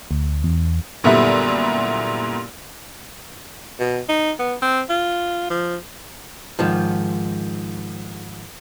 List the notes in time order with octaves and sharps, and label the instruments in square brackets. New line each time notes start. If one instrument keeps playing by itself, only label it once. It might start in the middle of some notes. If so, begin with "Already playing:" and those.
[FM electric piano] D2
E2
[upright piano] F#2 A#2 D3 G3 B3 E4
[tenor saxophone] B2
D#4
B3
C4
F4
F3
[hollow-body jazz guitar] G#2 D#3 F3